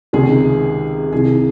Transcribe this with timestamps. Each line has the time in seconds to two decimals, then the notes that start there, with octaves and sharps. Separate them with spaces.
0.13 C#2 C3 D#3 G#4
1.12 C2 C3 D#3 G#4